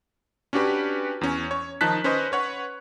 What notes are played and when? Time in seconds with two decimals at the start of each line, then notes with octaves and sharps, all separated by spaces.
0.53 C#4 D4 F#4 G4 B4
1.21 E2 C#4
1.51 C#5
1.81 D#3 F3 D#4 A5 F#6 B6
2.04 C#4 B4 C5 D#5
2.32 B4 C#5 F#5